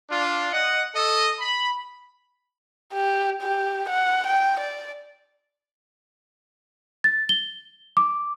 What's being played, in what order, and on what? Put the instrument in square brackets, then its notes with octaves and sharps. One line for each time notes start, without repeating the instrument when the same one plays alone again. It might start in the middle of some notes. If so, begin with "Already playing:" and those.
[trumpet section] D4 F4
D#5 F#5
A4 D#5
B5
[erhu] G4
G4
F#5
G5
D5
[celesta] A6
G7
D6